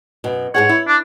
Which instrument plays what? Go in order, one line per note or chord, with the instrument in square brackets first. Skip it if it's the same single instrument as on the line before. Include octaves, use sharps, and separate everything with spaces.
[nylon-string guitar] F#2 B2
[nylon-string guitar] G#2 G#4 F#5 [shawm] C#5
[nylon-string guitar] E4
[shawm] D4